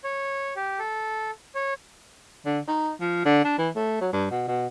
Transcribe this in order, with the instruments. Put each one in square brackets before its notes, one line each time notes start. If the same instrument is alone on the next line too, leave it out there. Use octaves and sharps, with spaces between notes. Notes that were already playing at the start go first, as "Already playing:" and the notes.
[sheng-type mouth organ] C#5
G4
A4
C#5
[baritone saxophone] D3
D#4
F3
D3
D4
E3
A3
F#3
G2
B2
B2